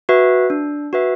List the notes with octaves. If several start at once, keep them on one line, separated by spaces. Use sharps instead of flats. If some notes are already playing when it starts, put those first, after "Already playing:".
F#4 B4 E5
D4
F#4 B4 E5